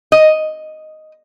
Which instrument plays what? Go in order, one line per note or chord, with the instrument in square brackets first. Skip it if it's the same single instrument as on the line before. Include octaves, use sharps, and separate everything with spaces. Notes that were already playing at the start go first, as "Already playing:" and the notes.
[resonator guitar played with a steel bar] D#5